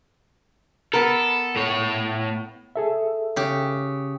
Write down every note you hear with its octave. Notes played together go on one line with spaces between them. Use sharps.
B3 A4 A#4
A2 C#5
G#4 A4 E5
C#3 G4